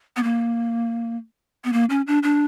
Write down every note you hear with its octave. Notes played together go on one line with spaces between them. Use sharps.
B3
A#3
B3
A#3
C#4
D4
D4